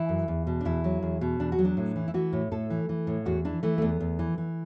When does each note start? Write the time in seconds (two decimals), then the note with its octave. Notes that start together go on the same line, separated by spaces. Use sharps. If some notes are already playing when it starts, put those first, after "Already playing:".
Already playing: E3 E4
0.09 F#2
0.28 E2
0.47 B2
0.61 D4
0.65 E2 E4
0.84 F#3
1.03 E2
1.21 B2
1.40 E2 D4
1.52 F#4
1.58 F#3
1.65 D4
1.77 A2
1.96 E3
2.08 E4
2.14 E3 F#4
2.33 A2
2.52 A2 A4
2.70 E3
2.89 E3
3.07 A2
3.26 E2 F#4
3.45 E3 D4
3.63 E3 A3
3.78 A3
3.82 E2 B3
4.00 E2
4.19 E3
4.38 E3